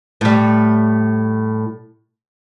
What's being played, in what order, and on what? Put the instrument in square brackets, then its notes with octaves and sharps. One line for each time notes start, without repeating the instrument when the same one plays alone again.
[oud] A2 G3